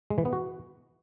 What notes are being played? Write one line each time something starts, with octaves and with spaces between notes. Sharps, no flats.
G#3
E3
B3
F#4